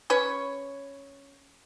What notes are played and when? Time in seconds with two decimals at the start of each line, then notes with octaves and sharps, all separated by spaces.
0.10 C#4 B4 C#5